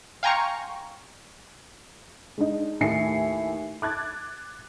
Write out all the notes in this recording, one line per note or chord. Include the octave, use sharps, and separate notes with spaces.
F5 G5 G#5 A#5 C6 C#6
G#3 D4 D#4
D#2 A2 E5 G#5 C7 C#7
D6 F#6 G#6 A6